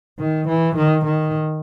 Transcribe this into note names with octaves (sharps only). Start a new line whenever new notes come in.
D#3
E3
D#3
D#3